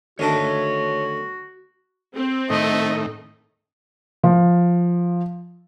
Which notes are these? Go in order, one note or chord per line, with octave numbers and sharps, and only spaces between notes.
D2 D#3 A3 F#4 C#5 A5
C4
A2 D#3 A3 D#5
F3